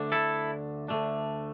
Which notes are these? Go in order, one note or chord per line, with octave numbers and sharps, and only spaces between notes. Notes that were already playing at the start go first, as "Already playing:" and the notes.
Already playing: D2 D3 A3 D4
E4 A4
D2 D3 A3 D4